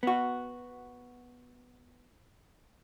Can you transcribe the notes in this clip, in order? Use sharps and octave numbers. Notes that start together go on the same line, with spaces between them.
B3 F#4